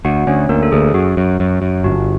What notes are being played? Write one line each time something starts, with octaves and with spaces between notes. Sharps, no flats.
D2 F#4 F#5
D2 C#4 C#5
D2 A#3 A#4
A4
D2 G#4
F#2 F#4
F#2
F#2
F#2
G1 F#4